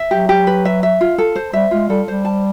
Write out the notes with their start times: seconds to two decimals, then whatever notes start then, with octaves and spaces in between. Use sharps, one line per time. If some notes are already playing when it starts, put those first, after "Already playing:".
Already playing: E5
0.11 F#3 G4
0.29 G4
0.47 B4
0.65 E5
0.83 E5
1.01 F4
1.18 A4
1.36 C5
1.53 G3 E5
1.71 G#3 F4
1.89 G3 A4
2.08 G3 C5
2.25 A5